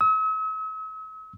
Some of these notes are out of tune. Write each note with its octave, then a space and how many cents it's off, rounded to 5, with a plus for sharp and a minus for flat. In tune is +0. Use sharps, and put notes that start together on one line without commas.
E6 -45